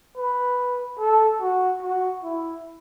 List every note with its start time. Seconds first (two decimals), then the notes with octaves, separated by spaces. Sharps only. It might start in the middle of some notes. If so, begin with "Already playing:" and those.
0.17 B4
0.99 A4
1.41 F#4
1.82 F#4
2.24 E4